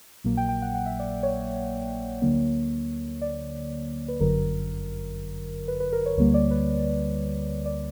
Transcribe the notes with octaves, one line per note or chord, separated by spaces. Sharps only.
A#1 A#2 F#3 A#3
G5
G5
F#5
F#5
E5
D5
C#5
D2 D3 F#3 A#3
D5
B4
G1 F#2 D3 F#3 A#4
B4
B4
A#4
C#5
D2 D3 G3 A#3 C#5
D5
B4
D5